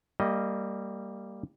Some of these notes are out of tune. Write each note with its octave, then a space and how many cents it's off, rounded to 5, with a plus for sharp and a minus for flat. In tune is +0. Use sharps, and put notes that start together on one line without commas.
G3 +0 A#3 -25 D#5 +5